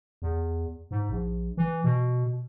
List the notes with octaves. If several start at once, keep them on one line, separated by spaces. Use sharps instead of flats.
E2
G#2
A#1
E3
B2